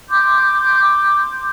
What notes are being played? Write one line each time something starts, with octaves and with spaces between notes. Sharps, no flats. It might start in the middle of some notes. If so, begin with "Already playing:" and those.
C6 D6 G6